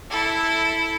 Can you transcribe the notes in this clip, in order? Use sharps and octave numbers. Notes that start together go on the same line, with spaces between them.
E4 A4